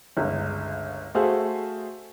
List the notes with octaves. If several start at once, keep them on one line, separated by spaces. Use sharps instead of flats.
G1 C#2
A3 F#4 G#4 C5 E5 F5